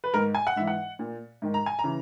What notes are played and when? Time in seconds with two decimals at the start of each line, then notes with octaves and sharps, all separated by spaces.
0.04 B4
0.14 G#2 D#3 A#4
0.35 G#5
0.47 F#5
0.56 G#2 E3 E5
0.67 F#5
0.99 A#2
1.42 G#2 D#3
1.54 A#5
1.66 G#5
1.79 A#5
1.84 C#3 E3